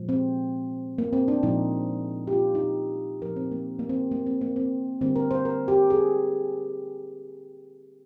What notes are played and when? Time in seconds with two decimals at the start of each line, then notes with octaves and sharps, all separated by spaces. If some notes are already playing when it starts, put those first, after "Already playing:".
Already playing: A#2 F3 G#3
0.09 C4
0.98 A#3
1.13 C4
1.28 D4
1.43 A#2 F3 G#3 D#4
2.27 G4
2.33 F4
2.55 D#4
3.21 A#2 F3 A#3 A#4
3.36 C4
3.52 A#3
3.79 A#3
3.89 C4
4.12 A#3
4.26 C4
4.41 A#3
4.56 C4
5.01 D3 G3 A#3 C4
5.16 A#4
5.31 C5
5.45 A#4
5.68 G4
5.90 G#4